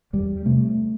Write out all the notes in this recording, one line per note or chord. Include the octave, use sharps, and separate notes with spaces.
E2 G3
C3 A3